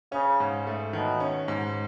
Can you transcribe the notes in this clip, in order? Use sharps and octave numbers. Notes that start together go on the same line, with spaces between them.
C#3 C#4
G#2
A3
B2 D#3
C#4
G#2